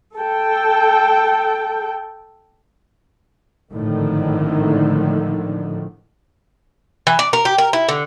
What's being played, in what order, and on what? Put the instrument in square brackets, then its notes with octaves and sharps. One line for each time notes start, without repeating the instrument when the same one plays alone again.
[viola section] A4 G5
[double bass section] G#1 A2 D3 D#3 F3
[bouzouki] E3
D5
A#4
G4
A#4
E4
D3